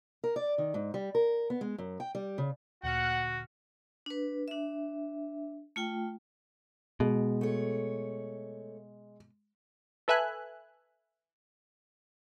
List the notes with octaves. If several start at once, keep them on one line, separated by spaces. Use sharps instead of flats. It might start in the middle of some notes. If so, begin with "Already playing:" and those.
A#4
D5
D#3
G#2
G3
A#4
B3
G#3
F#2
G5
G3
C#3
D2 A#2 F#4 F#5 F6
D4 B4
D4 E5
A3 F4 G5
B2 G#3
A3 C#5
A4 B4 E5 G#5 F#6